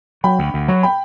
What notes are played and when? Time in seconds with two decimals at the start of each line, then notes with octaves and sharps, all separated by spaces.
0.24 F#3 G5 B5
0.39 D2
0.54 D2
0.68 F#3
0.83 G5 B5